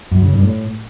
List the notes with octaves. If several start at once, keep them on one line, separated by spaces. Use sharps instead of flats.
F#2
C#3
G2
A2